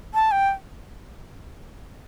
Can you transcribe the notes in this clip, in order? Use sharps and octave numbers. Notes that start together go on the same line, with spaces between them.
A5
G5